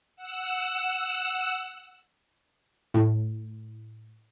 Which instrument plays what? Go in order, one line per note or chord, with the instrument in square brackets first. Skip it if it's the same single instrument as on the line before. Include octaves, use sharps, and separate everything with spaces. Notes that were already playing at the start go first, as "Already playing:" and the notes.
[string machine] F#5 E6
[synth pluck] A2